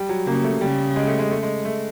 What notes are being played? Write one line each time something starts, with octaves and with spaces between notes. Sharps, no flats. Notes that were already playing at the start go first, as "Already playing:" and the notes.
Already playing: G3
F#3
C#3 A#3
A3
C#3 G3
G#3
A3
G#3
A3
G#3
A3